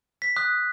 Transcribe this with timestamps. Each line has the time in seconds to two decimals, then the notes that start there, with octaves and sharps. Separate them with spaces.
0.22 B6
0.37 D#6 F#6